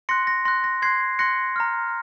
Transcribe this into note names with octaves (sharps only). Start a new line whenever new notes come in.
C6 F#6 A#6 C#7
A#6
C6 F#6 A#6
A#6
C6 F#6 G#6 C7
C6 F#6 A#6 C#7
A#5 F6